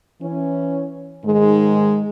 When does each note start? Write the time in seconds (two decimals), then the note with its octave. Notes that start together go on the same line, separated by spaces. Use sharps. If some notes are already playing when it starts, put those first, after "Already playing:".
0.22 E3 C#4
1.25 G#2 D#3 G#3